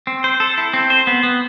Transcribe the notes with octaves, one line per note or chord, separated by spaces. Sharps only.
C4
C5
A4
E4
C4
C5
B3
B3